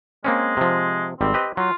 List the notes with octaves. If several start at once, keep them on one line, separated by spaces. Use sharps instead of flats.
G#3 A#3 C4 C#4
C3 F3
G#1 G3 C4
G4 B4 D#5
F#3 F4